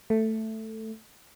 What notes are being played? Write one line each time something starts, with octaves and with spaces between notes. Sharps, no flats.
A3